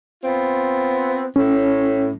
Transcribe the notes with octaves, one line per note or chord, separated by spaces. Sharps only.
B3 C4 F4
A2 C#4